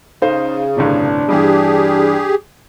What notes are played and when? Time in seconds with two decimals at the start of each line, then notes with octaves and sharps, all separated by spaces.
0.22 C#3 D#4 C5 F5
0.77 G1 A2 C3 D4
1.29 G2 E3 G4 G#4